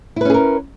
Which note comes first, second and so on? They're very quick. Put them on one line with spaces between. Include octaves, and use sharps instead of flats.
E4 B4 C#4 G#4 A#4